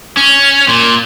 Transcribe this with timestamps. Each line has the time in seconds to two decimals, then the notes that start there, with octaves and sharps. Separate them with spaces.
0.17 C#4
0.68 A#2